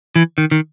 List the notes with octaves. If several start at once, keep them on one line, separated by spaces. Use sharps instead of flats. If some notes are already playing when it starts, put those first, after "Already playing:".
E3
D#3
D#3